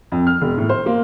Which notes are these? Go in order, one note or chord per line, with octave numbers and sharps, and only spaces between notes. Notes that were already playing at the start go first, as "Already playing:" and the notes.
F2
F6
E1
A2
C5
A#3